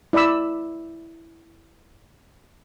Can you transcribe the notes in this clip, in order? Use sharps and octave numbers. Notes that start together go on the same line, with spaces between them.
E4 D5 E5 B5 E6